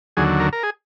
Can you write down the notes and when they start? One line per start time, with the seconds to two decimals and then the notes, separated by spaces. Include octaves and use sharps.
0.17 D#2 D3 F#3 G#4
0.40 A#4
0.53 A#4
0.63 G#4